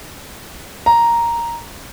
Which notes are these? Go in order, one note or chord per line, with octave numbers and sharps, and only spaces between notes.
A#5